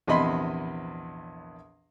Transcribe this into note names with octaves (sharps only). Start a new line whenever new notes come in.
A#1 E2 C3 D#5 B5 C6